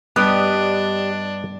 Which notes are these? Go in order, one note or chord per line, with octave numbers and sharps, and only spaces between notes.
G2 B3 D4 G4 B4 D#5 G5